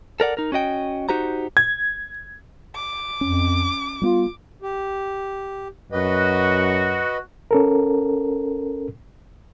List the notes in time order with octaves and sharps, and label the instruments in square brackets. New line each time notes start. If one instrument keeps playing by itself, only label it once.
[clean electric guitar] A4 A#4 D5 F#5
D#4 A#4
C#4 F#4 D#5 G5
D#4 F#4 G4 C5 A#5
[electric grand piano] G#6
[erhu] D6
[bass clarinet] F2 [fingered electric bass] C#4
[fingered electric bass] G3 B3 [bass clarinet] F4
[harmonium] G4
[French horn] F#2 [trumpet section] F#4 [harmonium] B4 D#5
[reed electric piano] C#4 A4 A#4